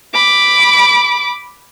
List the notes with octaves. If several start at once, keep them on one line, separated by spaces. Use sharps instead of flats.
B5 D6